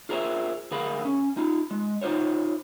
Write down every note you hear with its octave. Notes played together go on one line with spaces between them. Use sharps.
F4 G#4 A#4 C5 D5 E5
D2 G#4 A#4 F5 B5
C#4
D#4 F4
G#3
D#4 F4 A#4 C5 C#5